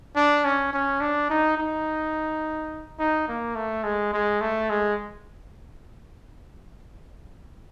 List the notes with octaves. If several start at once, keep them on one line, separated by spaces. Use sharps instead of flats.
D4
C#4
C#4
D4
D#4
D#4
D#4
A#3
A3
G#3
G#3
A3
G#3